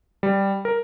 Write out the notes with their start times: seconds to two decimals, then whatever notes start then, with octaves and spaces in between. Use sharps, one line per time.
0.23 G3
0.65 A#4